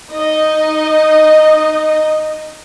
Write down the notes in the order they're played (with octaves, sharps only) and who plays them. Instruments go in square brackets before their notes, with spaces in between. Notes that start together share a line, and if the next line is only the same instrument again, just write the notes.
[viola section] D#4 D#5